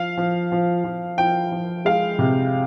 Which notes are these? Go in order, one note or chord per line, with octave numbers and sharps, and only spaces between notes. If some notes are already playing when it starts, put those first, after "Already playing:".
Already playing: F3 F5
F3
F3
F3
F3 G5
F3
G#3 F5
C3